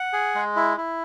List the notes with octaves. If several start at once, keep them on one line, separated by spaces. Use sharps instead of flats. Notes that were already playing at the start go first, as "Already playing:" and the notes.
Already playing: F#5
G#4
G#3
E4
E4